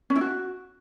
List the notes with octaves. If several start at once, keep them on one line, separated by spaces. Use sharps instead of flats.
C#4
E4
F#4